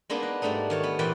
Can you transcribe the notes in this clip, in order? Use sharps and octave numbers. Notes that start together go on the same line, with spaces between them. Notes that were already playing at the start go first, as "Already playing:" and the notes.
G#3 A#3 B3 D4 D#4
B4
G#2 G3 A3 D4 D#4
D#3 C#5 A5
B3
A#2 E3 D5 F#5 G5 B5